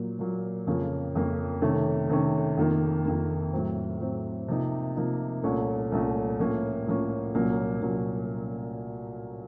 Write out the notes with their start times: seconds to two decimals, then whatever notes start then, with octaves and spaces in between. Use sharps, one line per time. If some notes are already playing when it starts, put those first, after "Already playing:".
Already playing: A#2 F#3 A#3
0.19 A#2 F#3 A#3
0.67 F2 C#3 F3 A#3 C#4
1.15 F2 C#3 F3 A#3 C#4
1.62 C3 D#3 A3 C#4
2.09 C3 D#3 A3 C#4
2.57 F2 D#3 A#3
3.05 F2 D#3 A#3
3.53 A2 F#3 C4
4.01 A2 F#3 C4
4.48 C3 F3 A#3 D#4
4.96 C3 F3 A#3 D#4
5.43 C2 A#2 A3 C#4
5.92 C2 A#2 A3 C#4
6.39 A2 F3 A#3 C#4
6.86 A2 F3 A#3 C#4
7.35 C2 A#2 F#3 A#3 C#4
7.82 C2 A#2 F#3 A#3 C#4